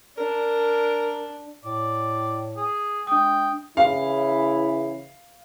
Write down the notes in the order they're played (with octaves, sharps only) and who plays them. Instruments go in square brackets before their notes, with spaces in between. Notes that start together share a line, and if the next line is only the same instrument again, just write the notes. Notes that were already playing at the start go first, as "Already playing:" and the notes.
[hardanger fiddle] D4 [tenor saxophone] A#4
[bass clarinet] A2 [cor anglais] D5
[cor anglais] G#4
[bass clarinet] G#3 [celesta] D4 D#6 [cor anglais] G5
[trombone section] C#3 E3 E4 [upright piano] F5